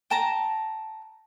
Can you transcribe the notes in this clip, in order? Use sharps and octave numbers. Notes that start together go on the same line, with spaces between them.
G5 A5 A#5